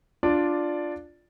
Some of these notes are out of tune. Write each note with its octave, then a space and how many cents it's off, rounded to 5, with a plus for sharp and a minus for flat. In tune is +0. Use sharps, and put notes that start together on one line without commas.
D4 +5 F4 +0 D5 +0